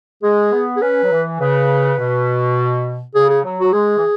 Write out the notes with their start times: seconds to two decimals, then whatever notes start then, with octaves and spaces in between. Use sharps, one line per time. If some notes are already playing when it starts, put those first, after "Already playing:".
0.23 G#3 G#4
0.52 B3
0.76 G#4
0.81 C#4 B4
1.03 F#3
1.10 E3
1.39 C#3 B4
1.98 B2
3.15 C#3 G#4
3.30 G#4
3.44 F#3
3.59 F#3 F#4
3.73 G#3 G#4
3.97 E3